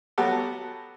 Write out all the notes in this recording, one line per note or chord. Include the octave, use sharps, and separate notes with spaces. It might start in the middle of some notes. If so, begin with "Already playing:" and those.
F#3 B3 F#4 G4 A4